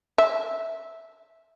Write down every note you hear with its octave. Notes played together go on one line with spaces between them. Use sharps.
E5